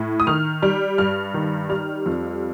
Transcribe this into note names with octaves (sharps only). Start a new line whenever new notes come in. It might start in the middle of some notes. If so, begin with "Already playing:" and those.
Already playing: A2
D#6
D#3 F6
G3 F6
G2 F6
D#3
G3 F6
F2